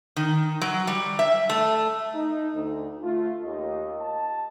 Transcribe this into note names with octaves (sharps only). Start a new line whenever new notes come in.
D#3
F#3
G3
E5
A3
D#4
D2
A3 F4
D#2 D#5
A5